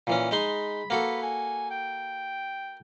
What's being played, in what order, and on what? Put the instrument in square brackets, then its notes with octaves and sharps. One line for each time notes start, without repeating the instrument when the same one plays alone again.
[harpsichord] A#2 E3 C#4
[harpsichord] G#3 D#4 C6 [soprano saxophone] B5
[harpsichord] A#3 F#4 A4 [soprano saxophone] B4
[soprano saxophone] G#5
G5